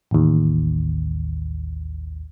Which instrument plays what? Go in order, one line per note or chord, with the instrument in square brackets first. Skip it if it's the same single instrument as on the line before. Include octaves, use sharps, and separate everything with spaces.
[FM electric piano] A1 D#2